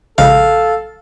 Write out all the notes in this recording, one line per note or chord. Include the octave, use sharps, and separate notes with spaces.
A#1 C#3 G#3 A4 F5